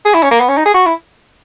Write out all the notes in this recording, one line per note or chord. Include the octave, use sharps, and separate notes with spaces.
G#4
E4
C#4
A#3
B3
C#4
D#4
G#4
F#4
E4